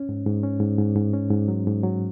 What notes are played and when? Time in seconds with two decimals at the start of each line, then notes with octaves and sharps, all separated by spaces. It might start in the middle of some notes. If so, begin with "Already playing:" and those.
Already playing: C#4
0.09 G#2
0.26 G#2
0.43 C#4
0.60 G#2
0.78 G#2
0.96 G#2
1.13 C#4
1.31 G#2
1.48 F#3
1.67 G#2
1.83 F#3